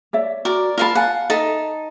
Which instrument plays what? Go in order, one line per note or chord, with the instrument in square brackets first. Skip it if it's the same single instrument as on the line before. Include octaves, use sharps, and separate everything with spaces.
[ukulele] C#5 D5 E5
[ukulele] F#4 [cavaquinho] A#4 D5
[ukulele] F4 D5 B5 [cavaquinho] A#4 F5 A5
[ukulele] F5 G#5 [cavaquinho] F#5
[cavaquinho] D#4 A5 [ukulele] A4 E5